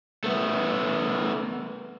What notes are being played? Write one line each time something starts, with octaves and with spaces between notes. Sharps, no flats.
A3 B3